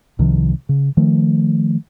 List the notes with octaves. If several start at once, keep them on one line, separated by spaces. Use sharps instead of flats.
C2 C3 D#3 F3
C#3
D#3 F3 A3